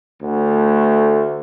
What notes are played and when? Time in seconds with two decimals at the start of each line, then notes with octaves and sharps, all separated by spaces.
0.22 D2 A3